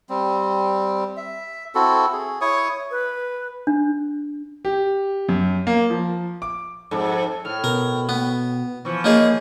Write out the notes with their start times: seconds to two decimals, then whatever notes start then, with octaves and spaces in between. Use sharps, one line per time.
0.09 G3 C4
1.17 E5
1.75 C4 E4 F#4 A4
2.13 G#4
2.41 E4 C#5 C#6 D#6
2.91 B4
3.67 D4
4.65 G4
5.29 F#2
5.67 A#3
5.90 F3
6.42 D6
6.91 F2 G#2 A4
7.45 A2 F6
7.64 B2 A#4
8.09 B3
8.85 E3 F3 C#6
9.04 A#3 D#4 G#4 C#5